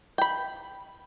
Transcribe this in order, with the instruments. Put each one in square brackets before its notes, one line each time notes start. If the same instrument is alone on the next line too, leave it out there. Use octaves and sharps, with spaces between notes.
[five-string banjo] G5 B5